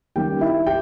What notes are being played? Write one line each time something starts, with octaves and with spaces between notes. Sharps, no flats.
D#3 G3 A#3 C#4 G4 G5
E4 E5
G4 G5